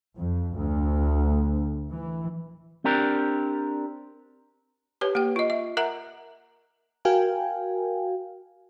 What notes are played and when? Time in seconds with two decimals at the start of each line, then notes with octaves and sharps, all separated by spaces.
0.16 F2
0.57 D2
1.90 E3
2.84 C4 D4 G4 A#4
5.01 G4 B4 C#5
5.15 A#3 G4 G5
5.36 F4 D#5
5.50 E5
5.77 A#4 E5 F#5 A#5
7.05 F#4 A#4 F5 G5 G#5